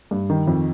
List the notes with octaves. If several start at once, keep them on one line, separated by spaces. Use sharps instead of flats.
G2
D#3
F2